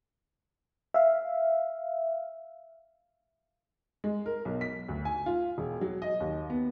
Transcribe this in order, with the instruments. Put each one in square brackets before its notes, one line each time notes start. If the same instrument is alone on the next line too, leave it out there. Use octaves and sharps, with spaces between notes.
[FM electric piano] E5 F5
[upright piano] G#3
A#4
B1
B6
D2
G#5
F4
E1
F#3
D#5
D#2
B3